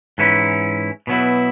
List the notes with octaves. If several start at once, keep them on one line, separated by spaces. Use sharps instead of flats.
G#2 E3 C#4 E4
B2 F#3 B3 E4